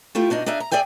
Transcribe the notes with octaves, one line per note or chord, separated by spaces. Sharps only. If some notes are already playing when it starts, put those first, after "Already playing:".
A3 E4 F4 G4
G2 B2 D4 D#4
D4 D#4 G#4 E5 F5
A#5
G#4 D5 E5 G5 G#5